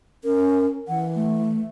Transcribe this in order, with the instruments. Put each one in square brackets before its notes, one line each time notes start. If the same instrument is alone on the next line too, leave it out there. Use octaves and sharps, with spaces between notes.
[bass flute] C#4 [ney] A#4
[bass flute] E3 [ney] F#5
[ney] A3